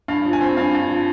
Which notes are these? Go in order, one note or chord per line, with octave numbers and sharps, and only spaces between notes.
G2 F5
F3
G#5
C4
G2 F5
G2
F3